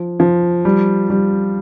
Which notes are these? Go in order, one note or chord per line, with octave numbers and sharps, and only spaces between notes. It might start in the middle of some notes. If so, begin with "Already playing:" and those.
Already playing: F3
F3
G3
G3